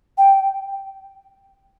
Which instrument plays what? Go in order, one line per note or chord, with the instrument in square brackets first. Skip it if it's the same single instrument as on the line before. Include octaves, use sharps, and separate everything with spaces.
[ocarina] G5